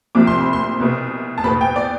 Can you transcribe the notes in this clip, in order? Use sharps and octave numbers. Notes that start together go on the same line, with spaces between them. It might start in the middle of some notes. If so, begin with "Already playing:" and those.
C2 C3 F3 D6
C6
B5
C6
C2 B2 B3
A5
E2 B2 B3 B5
G5
D5